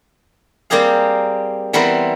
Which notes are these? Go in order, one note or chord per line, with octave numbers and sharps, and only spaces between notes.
G3 A#3 C4 G4 G#4 F5
E3 G3 B3 C4 E4 A#4